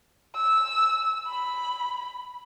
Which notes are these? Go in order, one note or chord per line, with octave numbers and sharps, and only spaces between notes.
E6
B5